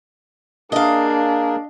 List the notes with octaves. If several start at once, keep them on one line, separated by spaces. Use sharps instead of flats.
A#3 D4 G#4 A#4 D#5 F5